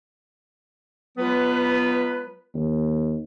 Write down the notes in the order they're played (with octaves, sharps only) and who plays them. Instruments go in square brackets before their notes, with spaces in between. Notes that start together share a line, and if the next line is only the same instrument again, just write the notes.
[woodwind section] F#3 G#3 B3 F4 B4
[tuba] D#2